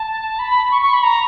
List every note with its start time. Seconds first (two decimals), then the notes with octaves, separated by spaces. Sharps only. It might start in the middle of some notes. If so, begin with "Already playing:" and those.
Already playing: A5
0.39 B5
0.71 C#6
0.82 C#6
0.93 B5
1.03 A#5